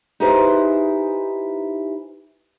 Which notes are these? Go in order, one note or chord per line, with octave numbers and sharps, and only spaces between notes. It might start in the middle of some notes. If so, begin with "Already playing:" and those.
D#4 E4 G4 G#4 B4 C5